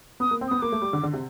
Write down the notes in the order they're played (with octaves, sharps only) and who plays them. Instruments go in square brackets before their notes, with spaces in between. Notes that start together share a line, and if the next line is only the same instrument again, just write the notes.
[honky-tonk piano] B3 [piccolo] D#6
[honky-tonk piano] A#3
C4
[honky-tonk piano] B3 [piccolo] D#6
[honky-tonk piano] A#3 [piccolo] D6
[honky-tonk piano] A3
G3
D3
D3
C3